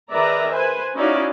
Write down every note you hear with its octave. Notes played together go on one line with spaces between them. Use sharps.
D#3 G#4 B4 D5 E5 A#5
B4 C5 G#5
C#4 D#4 E4 F#4 D5 F5